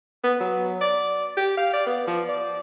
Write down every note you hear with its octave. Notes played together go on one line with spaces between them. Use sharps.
B3
F#3
D5
G4
F5
D5
B3
F3
D5